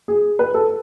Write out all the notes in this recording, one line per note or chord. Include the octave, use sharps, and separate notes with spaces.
G#4
B4
A4